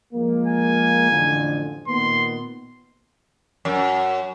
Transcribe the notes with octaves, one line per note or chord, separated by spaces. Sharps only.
F3 G#3 A#3
G#5
A1 F2 D3
A#2 D#3 B3 C6
F#2